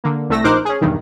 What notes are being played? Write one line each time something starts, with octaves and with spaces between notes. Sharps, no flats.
D3 A#3
C2 A3 E6 A#6
A#1 D#4 A#4 C5 D6 F#6
C#4 G#4
B1 E2 G2 D#3